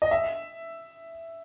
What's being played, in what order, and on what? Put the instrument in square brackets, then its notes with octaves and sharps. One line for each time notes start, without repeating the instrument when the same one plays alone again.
[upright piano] D#5
E5